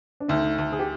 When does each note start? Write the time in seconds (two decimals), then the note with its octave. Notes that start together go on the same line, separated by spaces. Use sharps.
0.20 D4
0.28 D2 D#4
0.58 D2
0.72 G#4
0.79 G4